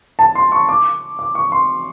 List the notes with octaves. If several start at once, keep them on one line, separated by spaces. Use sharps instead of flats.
A5
C6
C#6
D6
D6
C#6
C6